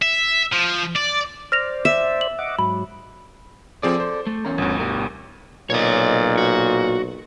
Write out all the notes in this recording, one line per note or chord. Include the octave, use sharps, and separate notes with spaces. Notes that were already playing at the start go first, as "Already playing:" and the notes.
E5
F3
D5
C5 D5 F6 A#6 F7
E5
F#7
D#5 F#5 D6
G#2 F#3 B5
F3 C4 G#4 A4 D5
C5
A3
E2 C#4 A#4
G1 D2
B2 G3 A#4
B1 A#2 C#5 D#5
F#4